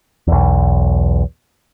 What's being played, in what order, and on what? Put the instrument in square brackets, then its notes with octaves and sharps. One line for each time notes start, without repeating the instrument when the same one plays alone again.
[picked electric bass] B1 E2